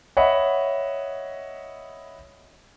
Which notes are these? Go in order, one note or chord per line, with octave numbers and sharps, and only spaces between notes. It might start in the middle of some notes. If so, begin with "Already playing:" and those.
C#5 D#5 E5 F#5 B5